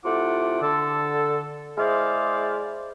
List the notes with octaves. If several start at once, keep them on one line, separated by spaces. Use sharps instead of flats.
C3 A3 E4 F4 F#5 D6
D3 A4
G#3 E4 G#4 C5 D5 F5